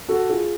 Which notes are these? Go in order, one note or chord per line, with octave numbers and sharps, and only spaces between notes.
F#4 A4
F4 G#4